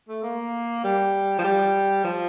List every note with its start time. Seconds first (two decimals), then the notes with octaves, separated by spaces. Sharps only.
0.08 A3
0.23 A#3
0.84 G3
1.38 F3
1.44 G3
2.04 F3